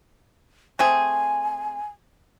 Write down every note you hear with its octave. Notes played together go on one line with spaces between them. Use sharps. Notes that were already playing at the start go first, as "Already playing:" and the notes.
A3 C4 G#4 G#5